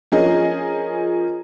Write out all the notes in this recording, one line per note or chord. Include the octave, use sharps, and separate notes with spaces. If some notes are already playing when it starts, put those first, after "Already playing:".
F3 C#4 G#4 A#4 D#5